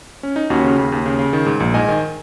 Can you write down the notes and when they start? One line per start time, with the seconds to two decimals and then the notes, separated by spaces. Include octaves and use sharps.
0.23 C#4
0.36 D#4
0.50 D#2 C#4 F#4
0.64 C#3
0.78 D#2
0.92 D#2
1.06 C#3
1.19 C#3
1.33 D#3
1.46 G#2
1.60 A#1
1.74 G#2 D#5 G#5
1.88 D#3